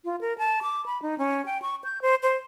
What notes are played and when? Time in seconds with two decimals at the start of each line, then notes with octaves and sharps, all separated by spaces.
0.05 F4
0.21 A#4
0.38 A5
0.62 D6
0.86 B5
1.02 D#4
1.18 C#4
1.46 G5
1.62 C#6
1.84 G6
2.02 C5
2.23 C5